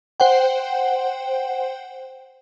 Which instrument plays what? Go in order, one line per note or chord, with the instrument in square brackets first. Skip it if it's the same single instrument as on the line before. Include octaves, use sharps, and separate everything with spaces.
[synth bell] C5 F#5 G5